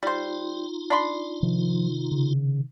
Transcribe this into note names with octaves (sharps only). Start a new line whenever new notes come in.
G3 D#4 F4 C5
D4 B5 C6
C3 D#3 F3
C#3